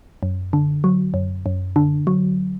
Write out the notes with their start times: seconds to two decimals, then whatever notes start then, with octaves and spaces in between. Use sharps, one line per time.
0.23 F#2
0.53 D3
0.84 F#3
1.14 F#2
1.46 F#2
1.76 D3
2.07 F#3